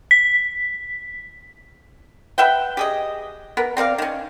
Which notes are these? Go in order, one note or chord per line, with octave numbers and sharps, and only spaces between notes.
B6
B4 E5 F#5 G5
G4 G#4 D#5
B3 A#4
C4 A#4 D5 F5
D#3 C#4